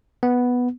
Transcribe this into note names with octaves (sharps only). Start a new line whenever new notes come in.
B3